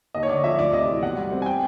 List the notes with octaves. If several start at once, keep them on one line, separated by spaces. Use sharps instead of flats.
D#2 D#5
C#5
D3 D5
F3 E5
D2 D5
C3 D#5
E3
B2 F#5
G3
C4
G#5
G5